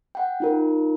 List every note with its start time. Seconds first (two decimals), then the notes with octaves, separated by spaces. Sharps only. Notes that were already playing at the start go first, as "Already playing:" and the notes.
0.15 F#5 G5
0.40 D#4 F4 A#4